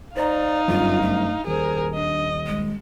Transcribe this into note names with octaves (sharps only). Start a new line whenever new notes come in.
D#4 C5 D5 F5 A#5
G1 F#2 F4
A3
D#1 G#4 A#4 C5
D4 D#5
G#3